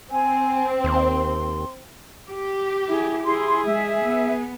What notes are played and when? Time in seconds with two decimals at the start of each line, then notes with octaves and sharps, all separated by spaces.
0.11 C4 G#5
0.84 D#2 C6
2.29 G4
2.87 E4 G#4
3.25 E4 G#4 C6
3.65 G#3 E5
4.04 B3